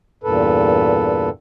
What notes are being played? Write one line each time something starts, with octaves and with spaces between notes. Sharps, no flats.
E2 G2 A#2 A4 B4